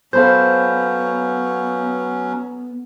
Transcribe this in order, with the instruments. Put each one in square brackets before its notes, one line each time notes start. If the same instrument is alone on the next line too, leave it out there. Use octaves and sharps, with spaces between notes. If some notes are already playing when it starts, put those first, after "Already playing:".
[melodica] F#3 C#4 [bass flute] B3 [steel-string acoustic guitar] A4 C5 [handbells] F5 B5 G6